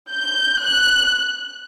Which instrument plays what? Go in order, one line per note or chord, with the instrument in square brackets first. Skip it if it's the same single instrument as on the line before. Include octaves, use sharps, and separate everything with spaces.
[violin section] G6
F#6